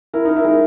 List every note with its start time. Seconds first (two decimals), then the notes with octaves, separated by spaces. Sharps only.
0.14 E4 A#4
0.25 D#4 A#4
0.36 E4
0.44 G#3 D#4